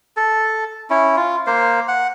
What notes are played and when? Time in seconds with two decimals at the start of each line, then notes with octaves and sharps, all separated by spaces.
0.17 A4
0.90 C#4 E4
1.17 F4
1.47 A#3 C5
1.88 F#5